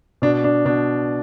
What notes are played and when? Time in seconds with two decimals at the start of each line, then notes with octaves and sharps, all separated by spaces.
0.22 B2 D4
0.44 D4
0.65 B2 D4